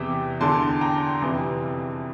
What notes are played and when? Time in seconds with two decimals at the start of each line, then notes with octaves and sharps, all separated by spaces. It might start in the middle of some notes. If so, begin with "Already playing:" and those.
Already playing: E2 C3 E3 E5 G5
0.41 E2 D3 A5 C6
0.81 G5 A#5
1.22 F2 C3 E3